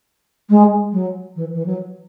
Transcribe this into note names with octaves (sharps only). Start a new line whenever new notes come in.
G#3
F#3
E3
E3
F#3